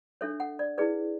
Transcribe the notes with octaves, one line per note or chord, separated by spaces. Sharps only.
D4 A4 C#5 E5
F#5
D5
E4 G#4 B4 D5